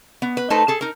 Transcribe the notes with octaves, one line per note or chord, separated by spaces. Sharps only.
B3
B4
A3 D#4 A4 B4 C5
G#4 A4
D#4 A#4